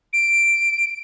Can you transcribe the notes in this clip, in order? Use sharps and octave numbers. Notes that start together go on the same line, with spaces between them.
D7